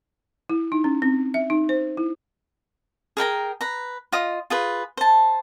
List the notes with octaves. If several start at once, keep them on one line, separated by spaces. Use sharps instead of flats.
E4
D#4
C#4
C4
E5
D#4
C5
E4
G#4 A#4 G5 A#5
B4 A#5
F4 D#5 D#6
F4 G#4 B4
C5 A5